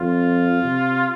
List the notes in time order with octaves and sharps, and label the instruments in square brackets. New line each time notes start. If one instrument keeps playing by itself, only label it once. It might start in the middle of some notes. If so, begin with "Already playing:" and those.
Already playing: [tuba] F2 [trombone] F4
[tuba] C3